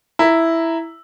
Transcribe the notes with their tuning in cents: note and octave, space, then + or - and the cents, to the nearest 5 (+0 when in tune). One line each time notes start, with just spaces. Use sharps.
E4 +0 A#5 +0